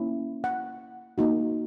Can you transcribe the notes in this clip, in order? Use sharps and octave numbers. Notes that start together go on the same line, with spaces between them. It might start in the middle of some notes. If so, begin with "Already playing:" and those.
Already playing: A#3 C#4 E4
F#5
A#3 D#4 F#4